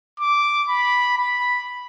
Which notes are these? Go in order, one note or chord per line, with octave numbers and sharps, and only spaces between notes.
D6
B5
B5